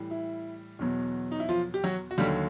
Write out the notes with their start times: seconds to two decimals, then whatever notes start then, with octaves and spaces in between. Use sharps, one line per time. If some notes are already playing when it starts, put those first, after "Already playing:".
Already playing: A2 E3 G3
0.11 E4
0.79 E2 B2 F#3
1.31 D#4
1.40 E4
1.49 F3 F4
1.74 G4
1.84 F#3 F#4
2.11 F#4
2.18 D#2 D3 F#3 G3 G4